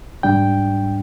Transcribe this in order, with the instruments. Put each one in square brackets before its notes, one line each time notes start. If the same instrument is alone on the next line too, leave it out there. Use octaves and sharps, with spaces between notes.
[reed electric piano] G#2 G3 D4 G5